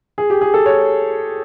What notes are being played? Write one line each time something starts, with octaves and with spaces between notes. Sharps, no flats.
G#4
G4
G#4
A4
C#5